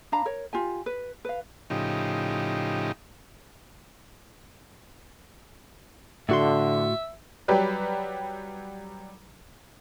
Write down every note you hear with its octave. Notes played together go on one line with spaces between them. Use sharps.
D4 F5 A#5 B5
A#4 C#5
F4 G4 G#5
B4
B4 F5
A2 C#3 F3 D#4 G4
A2 D3 F#4 E5 C6
F#3 G3 G4 B4